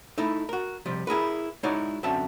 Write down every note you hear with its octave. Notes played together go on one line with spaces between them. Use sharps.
A3 D#4 E4
F#4 A#4
C3 F3 G3
E4 G#4 A#4 B4
G#3 D#4 E4 F#4 C#5 D5
F#2 D3 C4 C#4 E5 A5